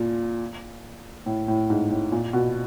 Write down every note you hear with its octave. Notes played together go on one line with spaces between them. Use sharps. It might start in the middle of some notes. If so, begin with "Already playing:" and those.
Already playing: A#2
A2
A2
G#2
A2
A#2
B2